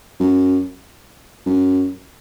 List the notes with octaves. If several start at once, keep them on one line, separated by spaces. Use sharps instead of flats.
F#2
F#2